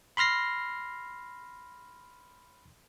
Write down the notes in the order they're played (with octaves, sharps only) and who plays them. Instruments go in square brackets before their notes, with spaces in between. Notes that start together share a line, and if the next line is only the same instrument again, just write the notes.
[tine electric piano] B5 C6 F6 A#6 C7